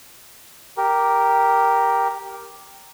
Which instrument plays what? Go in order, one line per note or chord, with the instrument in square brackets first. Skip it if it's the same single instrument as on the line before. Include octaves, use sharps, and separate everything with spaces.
[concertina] G4 A#4